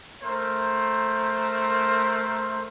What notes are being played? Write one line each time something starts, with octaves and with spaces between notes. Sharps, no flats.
A3 A#4 C5